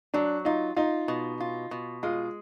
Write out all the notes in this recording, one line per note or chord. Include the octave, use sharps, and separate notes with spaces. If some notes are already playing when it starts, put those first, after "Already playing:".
F#3 D4
D#4 F4
D#4 F4
B2
F4
B2
G#3 F4